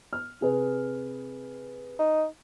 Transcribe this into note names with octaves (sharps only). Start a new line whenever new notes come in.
F6
C3 G#4 B4
D#4